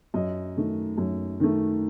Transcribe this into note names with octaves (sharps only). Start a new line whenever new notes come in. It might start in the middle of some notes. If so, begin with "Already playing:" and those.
F#2 D#5
D#3 A3
F#2
D#3 A3